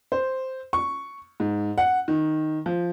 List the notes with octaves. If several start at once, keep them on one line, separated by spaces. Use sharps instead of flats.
C5
C#6
G#2
F#5
D#3
F3